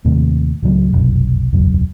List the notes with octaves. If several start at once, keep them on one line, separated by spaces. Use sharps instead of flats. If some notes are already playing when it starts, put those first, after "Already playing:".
D#2 A2 C3
C#2 A2 C#3 F#3
F1 B1 F#2
E1 C#2 F#2